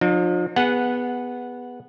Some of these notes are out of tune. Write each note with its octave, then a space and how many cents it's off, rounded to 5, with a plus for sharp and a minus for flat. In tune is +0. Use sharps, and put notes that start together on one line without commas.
F3 +35 D#4 -40
B3 -5 G#4 -20 F#5 -10